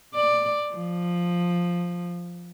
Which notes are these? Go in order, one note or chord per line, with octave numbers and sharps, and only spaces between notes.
D5
F3